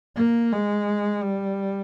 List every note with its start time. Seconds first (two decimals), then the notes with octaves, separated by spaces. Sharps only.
0.17 A#3
0.53 G#3
1.23 G3